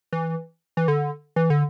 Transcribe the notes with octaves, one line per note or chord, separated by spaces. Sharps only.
E3
E3
D3
E3
D3